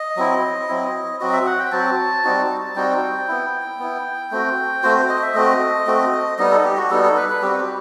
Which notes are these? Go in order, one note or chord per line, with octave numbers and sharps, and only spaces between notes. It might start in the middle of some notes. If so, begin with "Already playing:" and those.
Already playing: D#5
F#3 C4 E4
F#3 C4 E4
F#3 C4 F#4 D#5
E5
F#5
G5
F#3 C4 F#4 A5
G3 C4 D#4 F#4
G3 C4 D#4 F#4 G5
B3 E4
B3 E4
A3 C4 F#4
A3 C4 F#4 C5
C5
D#5
E5
A3 C4 F#4 D#5
A3 C4 F#4
G3 B3 D#4 D#5
A4
G4
F#4
G3 B3 D#4 A4
A4
B4
B4
G3 C4 F#4 G4